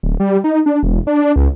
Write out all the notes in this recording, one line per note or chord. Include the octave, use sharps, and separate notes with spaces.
D1
G3
D#4
D4
E1
D4
C#2